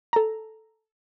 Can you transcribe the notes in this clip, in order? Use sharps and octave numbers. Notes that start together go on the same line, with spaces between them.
A4 A#5